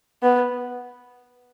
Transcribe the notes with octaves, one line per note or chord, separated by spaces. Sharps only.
B3